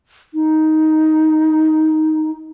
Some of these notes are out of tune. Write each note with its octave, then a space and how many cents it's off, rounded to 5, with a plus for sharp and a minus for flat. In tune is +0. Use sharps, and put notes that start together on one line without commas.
D#4 +10